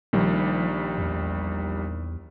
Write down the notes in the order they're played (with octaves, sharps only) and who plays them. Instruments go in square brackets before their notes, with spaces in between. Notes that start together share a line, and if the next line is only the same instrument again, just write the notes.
[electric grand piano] A#1 D#3 G3 [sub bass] F3
[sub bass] E2